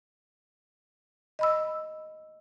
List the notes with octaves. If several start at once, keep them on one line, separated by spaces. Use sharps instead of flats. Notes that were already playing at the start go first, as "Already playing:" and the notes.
D#5 B5 E6